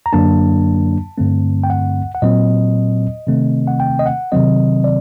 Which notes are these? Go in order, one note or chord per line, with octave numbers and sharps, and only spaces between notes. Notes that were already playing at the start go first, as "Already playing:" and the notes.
A#5
F#2 D3 F#3 A#3 D4 A5
G2 D3 A3 C4
G5
F#5
F#5
A#2 F#3 C4 D#5
C3 D#3 A3 C4
F#5
G5
D#5
F#5
C3 D#3 F#3 C4 D#5
D5